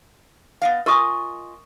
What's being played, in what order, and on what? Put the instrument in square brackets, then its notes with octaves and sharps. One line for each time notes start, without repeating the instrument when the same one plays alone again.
[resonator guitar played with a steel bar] B3 D#5 F5
[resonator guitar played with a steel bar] F4 D#5 G#5 [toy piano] A#4 C#6 D#6